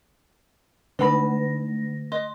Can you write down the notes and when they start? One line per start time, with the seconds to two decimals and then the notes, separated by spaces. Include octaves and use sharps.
0.99 D3 A3 D4 B4 B5 A#6
2.12 D#5 C6